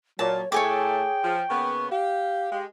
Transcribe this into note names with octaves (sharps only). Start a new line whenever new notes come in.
A#2 F#3 C#5 A5
A2 A3 G#4 C#5 G5 G#5 D6
F3
C#3 A#3 B3 C#6
G4 F5
G#3 G4